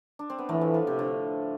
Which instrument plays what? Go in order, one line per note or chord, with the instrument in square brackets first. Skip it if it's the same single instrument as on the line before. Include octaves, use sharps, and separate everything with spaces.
[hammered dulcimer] D4
C4
B3
[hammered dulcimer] A2 A3 [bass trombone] E3
[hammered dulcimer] F3
F3
C3
D3